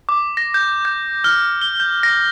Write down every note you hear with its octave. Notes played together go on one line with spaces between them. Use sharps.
D6
A#6
G6
G6
F6
G7
G6
A#6